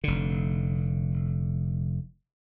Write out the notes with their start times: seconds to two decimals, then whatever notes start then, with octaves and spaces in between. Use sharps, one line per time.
0.04 F1 D3